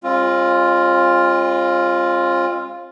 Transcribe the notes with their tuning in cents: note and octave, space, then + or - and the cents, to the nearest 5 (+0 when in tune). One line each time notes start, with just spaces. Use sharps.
G#3 -35 C4 +40 F4 +0